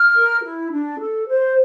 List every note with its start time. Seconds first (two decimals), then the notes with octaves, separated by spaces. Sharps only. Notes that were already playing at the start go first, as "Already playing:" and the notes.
Already playing: F6
0.15 A#4
0.43 E4
0.71 D4
0.99 A4
1.28 C5